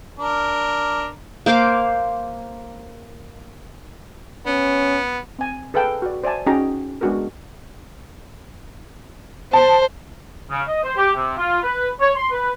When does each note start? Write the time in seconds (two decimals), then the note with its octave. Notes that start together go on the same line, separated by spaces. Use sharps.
0.19 D4 A#4
1.46 A#3 C5 F5 D6
4.46 B3 C#4
5.39 C4 G#5
5.74 G#4 A4 B4 F5 G5 A5
6.02 F#4 D5
6.24 C5 D5 E5 G#5 A5
6.47 C#4 D#4 F#4 G#4 G5 A#5
7.01 G#3 B3 D4 F#4 G#4 A#4
9.53 C5 A5
10.50 C#3
10.67 D#5
10.83 C5
10.97 G4
11.15 C3
11.37 F4
11.62 B4
12.01 C#5
12.16 C6
12.31 B4